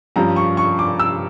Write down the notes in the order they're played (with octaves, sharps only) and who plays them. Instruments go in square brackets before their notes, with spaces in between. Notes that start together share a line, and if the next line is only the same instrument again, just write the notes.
[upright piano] G2 F3 C#4 A#5
C#6
C#6
D6
E6